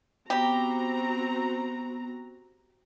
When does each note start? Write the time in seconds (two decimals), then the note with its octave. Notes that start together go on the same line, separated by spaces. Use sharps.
0.30 B3 C4 F#4 G4 A#5